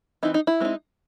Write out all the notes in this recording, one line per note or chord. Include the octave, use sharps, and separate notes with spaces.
E3 C4 D#4 E4
D#4
E4
G#3 C4 D#4